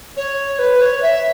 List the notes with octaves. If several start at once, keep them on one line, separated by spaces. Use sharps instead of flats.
C#5
B4
C#5
E5